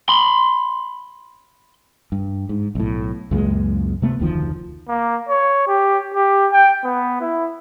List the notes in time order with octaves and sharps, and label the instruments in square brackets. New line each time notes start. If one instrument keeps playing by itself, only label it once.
[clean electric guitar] B5 C6
[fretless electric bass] G2
G#2
B1 A2
C#2 F#2 A#2 G#3
C3 A3 B3
F1 D2 D#3 F3
[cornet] A#3
C#5
G4
G4
G5
B3
E4